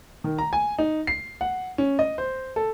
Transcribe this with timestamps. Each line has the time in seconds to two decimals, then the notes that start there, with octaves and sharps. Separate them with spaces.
0.24 D#3
0.38 A#5
0.53 G#5
0.78 D#4
1.07 C7
1.41 F#5
1.78 C#4
1.99 D#5
2.18 C5
2.56 A4